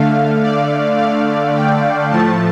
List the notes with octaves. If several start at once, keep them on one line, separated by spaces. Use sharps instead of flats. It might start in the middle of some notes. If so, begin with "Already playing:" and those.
Already playing: D3 A3 F5
D5
F5
G5
A2 F3 A3 A5